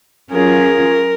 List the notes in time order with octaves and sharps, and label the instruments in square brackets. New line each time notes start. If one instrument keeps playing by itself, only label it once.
[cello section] F#3 C#4 F4 G#4 [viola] A#4